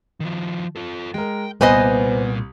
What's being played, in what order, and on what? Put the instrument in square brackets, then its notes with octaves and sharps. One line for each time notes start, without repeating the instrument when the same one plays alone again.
[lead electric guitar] D#3 F3
F4 A4
[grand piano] G#3 A#4 [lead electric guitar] G5
[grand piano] C2 D#6 [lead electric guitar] A#2 [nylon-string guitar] B3 G#5 [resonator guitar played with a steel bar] B4 C5 D#5